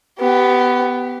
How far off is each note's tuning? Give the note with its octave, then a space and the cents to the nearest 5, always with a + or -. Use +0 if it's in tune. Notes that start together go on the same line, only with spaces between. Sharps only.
B3 +10 G4 -15